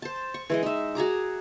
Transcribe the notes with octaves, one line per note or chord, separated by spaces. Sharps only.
C5 A5
C#6
E3 G#3 D#5
D#4 E5
F#4 G#4 A#5 D6